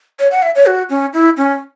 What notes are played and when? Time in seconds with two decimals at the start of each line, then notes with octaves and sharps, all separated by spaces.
0.19 C#5
0.31 F#5
0.42 E5
0.55 C#5
0.66 F#4
0.90 C#4
1.13 E4
1.37 C#4